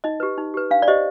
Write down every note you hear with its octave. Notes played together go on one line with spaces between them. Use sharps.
D#4 D#5
G4 B4
D#4
G4 B4
D4 F5
D5
G4 C5 D#5